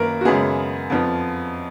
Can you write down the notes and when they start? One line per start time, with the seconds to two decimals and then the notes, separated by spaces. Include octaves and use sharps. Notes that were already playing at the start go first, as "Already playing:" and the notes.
Already playing: F#2 D#3 A#3 A#4 B4
0.21 F#4
0.25 F#2 C#3 G#3 B3 G#4
0.90 F2 F3 B3